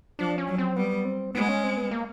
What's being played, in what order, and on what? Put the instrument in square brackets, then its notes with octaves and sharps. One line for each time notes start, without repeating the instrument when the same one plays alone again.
[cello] F3 [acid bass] D4
[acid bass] C#4
[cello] F#3
[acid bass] C4
[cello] G3 [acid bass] B3
[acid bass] C4
[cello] G#3 [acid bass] B3
[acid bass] C#4
C4
B3
A#3